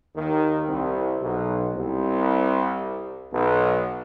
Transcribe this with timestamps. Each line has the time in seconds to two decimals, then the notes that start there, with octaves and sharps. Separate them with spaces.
0.15 D#2 D#3
0.68 C2 C3
1.21 B1 B2
1.74 C2 C3
3.33 B1 B2